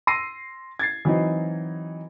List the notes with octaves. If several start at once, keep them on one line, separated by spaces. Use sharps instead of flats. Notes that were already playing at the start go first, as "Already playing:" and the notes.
C6 E6 A#6 C7 D#7
G#6 A6 C7
E3 F#3 C4 D#4